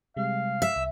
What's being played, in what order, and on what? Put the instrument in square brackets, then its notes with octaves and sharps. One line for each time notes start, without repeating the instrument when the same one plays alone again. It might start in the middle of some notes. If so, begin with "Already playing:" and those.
[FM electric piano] C3 G3 G#3 [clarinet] F5
[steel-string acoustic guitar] E5
[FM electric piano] C2